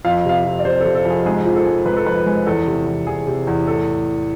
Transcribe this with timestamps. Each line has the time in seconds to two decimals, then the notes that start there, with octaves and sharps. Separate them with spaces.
0.05 F2 F5
0.25 C3 F5
0.45 F2
0.59 D5
0.65 C3 C5
0.80 A4
0.85 C3
0.95 A4
1.05 F2
1.10 G#4
1.26 G#2 G#4
1.46 F3
1.56 A4
1.65 G#3
1.86 G#2 B4
1.96 A4
2.06 F3 B4
2.26 G#3
2.47 E2 A4
2.67 C3
2.87 E2
3.07 E2 G#4
3.27 C3
3.47 E2
3.67 A2 A4